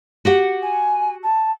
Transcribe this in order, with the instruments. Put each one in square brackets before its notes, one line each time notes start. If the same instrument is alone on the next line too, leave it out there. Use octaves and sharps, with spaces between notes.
[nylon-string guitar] F#4 G4 F#5
[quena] G#5
A5